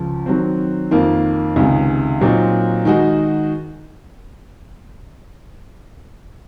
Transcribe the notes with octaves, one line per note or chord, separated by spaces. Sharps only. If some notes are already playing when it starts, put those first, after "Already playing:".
Already playing: C#2 C#3 F3
D#3 F#3 C4
F2 D#3 A#3 F4
C#2 C3 D#3 G#3
A#2 F#3 C4 D#4
D#3 G#3 D#4 F#4